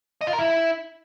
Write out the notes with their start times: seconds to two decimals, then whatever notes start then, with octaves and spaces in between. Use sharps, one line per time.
0.21 D#5
0.27 F4
0.33 A#4
0.39 E4